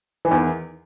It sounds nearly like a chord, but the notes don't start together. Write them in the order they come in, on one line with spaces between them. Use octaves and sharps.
E3 D#3 E2